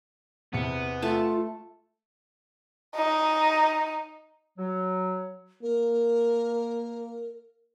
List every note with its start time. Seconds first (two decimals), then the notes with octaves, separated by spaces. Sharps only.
0.53 E2 C3 B3 C#7
1.02 A3 F4 A5
2.96 D#4
4.58 F#3
5.63 A#3 A#4